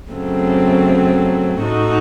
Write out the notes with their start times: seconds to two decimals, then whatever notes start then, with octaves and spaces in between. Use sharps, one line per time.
0.12 F#2 C#3 F#3 A3 C4
1.61 A2 A3 D#4 F#4